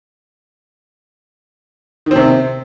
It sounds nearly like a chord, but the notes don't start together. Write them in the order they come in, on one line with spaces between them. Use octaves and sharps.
D#3 C4 C3